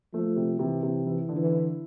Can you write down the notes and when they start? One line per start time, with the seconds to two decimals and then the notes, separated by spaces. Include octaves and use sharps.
0.13 F3 A3
0.36 C3
0.59 C3 E3
0.83 C3
1.06 E3 E4
1.29 D3
1.37 E3
1.52 E4